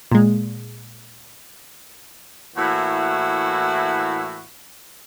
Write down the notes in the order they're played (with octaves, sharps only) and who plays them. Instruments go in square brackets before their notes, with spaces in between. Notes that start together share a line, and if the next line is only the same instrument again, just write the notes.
[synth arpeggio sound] A#2 G#3
[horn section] A2 E3 A#3 E4 F#4